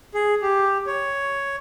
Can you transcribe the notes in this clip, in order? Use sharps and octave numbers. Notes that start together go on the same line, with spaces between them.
G#4
G4
C#5